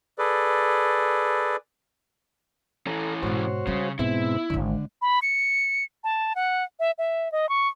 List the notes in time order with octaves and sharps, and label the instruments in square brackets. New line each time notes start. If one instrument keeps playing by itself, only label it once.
[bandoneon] G#4 A4 B4 D5
[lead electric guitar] E3 C#4 [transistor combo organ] A4 A#5
[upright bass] G#2 B2 [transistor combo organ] F#4 C5 C#5
[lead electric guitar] C#3 [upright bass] G3 C#4
[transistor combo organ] G#2 B2 C4 [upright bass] B3 D#4 [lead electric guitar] E4
[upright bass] D1 G#1 [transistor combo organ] D3
[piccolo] B5
C#7
A5
F#5
E5
E5
D#5
C#6